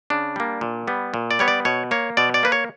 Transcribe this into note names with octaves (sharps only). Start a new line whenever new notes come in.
C#3 D4
G3 A#3
A#2
G3 B3
A#2
D5
G3 B3 C#5
D5
B2 C#5
A#3 C#5
B2 D5
D5
A#3 B4
C#5